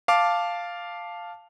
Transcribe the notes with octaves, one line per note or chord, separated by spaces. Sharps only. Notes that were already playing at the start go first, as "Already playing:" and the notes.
F5 A5 D6